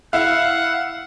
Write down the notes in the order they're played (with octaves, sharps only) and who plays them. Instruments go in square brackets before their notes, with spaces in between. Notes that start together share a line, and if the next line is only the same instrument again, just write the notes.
[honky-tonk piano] E4 F5 [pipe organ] F#5